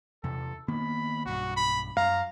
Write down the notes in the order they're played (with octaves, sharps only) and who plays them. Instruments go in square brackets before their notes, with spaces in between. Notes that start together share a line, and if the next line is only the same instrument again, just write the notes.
[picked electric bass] E2 C3 [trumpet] A4
[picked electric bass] D#3 A#3 B3 [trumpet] B5
[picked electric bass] B1 G2 [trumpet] F#4
[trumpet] B5
[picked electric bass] F#2 [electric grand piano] F5 [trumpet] A#5